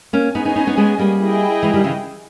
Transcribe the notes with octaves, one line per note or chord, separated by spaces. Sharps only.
A#3 C#4
B3 C#4 D#4 G#4 D#5 G#5
B3 D#4
B3 D#4
B3 D#4
G#3 B3
G3 A#3
E4 G#4 D#5 G5
E3 G#3
D#3 G3
C#3 E3